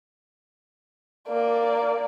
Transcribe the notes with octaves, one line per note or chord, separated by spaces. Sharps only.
A#3 D5